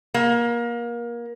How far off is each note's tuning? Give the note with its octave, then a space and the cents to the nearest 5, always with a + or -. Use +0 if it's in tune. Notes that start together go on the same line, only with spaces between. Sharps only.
A#3 +25